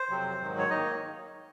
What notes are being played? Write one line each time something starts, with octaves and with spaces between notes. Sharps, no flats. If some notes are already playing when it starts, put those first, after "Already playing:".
Already playing: C5
F2 C3 F#3 C4
G#2 D#3 F#3
C#5
D#3 A#3 D#4 D#5